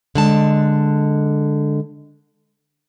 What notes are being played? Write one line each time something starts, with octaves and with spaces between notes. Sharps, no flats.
D3 G#3 A5